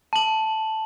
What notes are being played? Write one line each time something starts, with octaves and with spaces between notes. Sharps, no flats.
A5 F#7